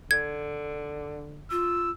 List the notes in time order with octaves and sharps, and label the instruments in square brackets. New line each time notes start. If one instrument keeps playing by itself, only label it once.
[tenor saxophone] D3 [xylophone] G#6
[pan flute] F4 [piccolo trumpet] E6